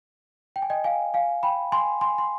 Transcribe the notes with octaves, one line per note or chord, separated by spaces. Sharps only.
G5
G#5
D#5 G5
F5 G#5
F5 G#5
G5 B5
G#5 C6
G#5 C6
C6